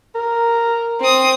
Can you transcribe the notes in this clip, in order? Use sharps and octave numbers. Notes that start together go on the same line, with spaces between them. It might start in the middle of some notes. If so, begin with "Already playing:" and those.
A#4
C4 D#6